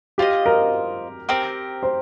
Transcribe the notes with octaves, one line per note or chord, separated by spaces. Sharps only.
F4 G4 C5 D#5
A#4
C4 G4 A#4
C5